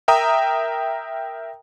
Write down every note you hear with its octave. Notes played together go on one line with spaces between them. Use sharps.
A#4 E5 G5 A#5 D#6